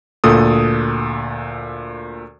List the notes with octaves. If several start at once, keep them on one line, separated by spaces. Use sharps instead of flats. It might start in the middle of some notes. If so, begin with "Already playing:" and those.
D2 A#2 A4 D#6